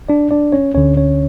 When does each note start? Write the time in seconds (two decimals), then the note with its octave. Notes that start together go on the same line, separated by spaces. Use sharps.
0.09 D4 D5
0.31 D4 D5
0.52 C#4 C#5
0.74 D2 D3 C#4 C#5
0.97 C#4 C#5